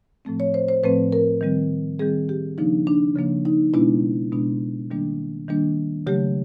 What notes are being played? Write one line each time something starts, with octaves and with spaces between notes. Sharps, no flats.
A2 F3 A3 C4
C#5
C5
C5
A2 F3 A3 C4 B4
A#4
D#3 G3 C4
D#3 G3 C4 G#4
G4
C#3 F3 A#3 D4 D#4
D4
C#3 F3 A#3 D4
D#4
B2 G#3 B3 D4 E4
B2 G#3 B3 D4
D#3 G3 A#3 D4
D#3 G3 A#3 D4
C#3 F#3 A3 G4